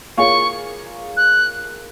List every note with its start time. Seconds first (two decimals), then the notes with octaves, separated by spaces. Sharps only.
0.17 A#3 F4 G#4 C#5 C#6
1.17 F#6